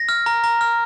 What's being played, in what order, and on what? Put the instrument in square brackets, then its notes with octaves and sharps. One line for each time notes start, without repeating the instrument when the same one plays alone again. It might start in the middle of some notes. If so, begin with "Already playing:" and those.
Already playing: [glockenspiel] A#6
F6
A#5
A#5
F6